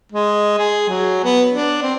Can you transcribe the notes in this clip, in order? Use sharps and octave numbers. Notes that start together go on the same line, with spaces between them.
G#3
G#4
F#3
B3
D4
C4